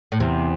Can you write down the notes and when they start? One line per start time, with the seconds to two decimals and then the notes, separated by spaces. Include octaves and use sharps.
0.12 A2
0.20 E2 C3